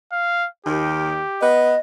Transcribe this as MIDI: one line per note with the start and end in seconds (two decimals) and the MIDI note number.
0.12 0.48 77
0.66 1.21 39
0.66 1.21 51
0.66 1.50 67
1.41 1.75 59
1.41 1.75 71
1.41 1.79 75